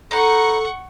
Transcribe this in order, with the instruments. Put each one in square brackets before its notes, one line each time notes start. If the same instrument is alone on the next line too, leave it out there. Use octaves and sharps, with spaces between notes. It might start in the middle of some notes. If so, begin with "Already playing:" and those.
[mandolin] D#4 B4 [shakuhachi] A4 [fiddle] F#5 C#6